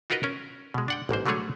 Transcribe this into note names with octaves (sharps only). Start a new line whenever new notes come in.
D#4 F4 F#4 A#4 B4 D#5
C#4 A#4
B2 G#3
D4 F#5 G5
A1 G#2 A#3 C5
D3 F#3 G3 A3 G#4 C#5